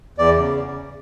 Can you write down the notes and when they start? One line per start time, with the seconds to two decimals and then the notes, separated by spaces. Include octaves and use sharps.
0.18 E2 D5
0.36 C#3